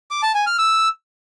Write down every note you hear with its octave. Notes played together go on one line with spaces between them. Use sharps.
D6
A5
G#5
F6
E6